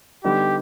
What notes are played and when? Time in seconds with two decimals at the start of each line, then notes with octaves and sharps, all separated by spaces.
0.24 D3 G3 B3 D#4 G4